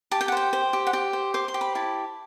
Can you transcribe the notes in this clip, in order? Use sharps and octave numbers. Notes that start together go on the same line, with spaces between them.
G4 A5
G5
F#5
C5 G5
C5
G4
F#5
G4 G5
C5
C5 D6
C6
G4
B5
E4 A5